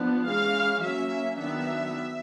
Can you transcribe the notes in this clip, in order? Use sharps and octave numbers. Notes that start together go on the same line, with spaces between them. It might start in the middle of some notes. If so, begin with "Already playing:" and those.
Already playing: F3 B3 D4
E3 G#3 C#4 F5
F#3 A#3 C#4 E5
D#3 F#3 B3 D4 E5